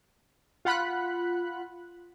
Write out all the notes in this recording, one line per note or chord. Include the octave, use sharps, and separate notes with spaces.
F4 F#5 B5 F#6